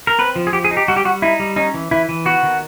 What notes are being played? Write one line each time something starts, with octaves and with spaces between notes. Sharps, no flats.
A#4
C4 B4
F3
G#4
F3 G4
G#4
D#4
G4
G3 F#4
G4
G3 F#4
D#4 E4
G3
C#4 D#4
E3
E3 E4
E3
B3 F#4
D#3